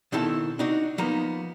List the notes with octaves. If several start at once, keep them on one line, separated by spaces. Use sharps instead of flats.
B2 D#3 C4 E4 A4
D4 D#4 F#4
F3 A#3 B3 D#4 A#5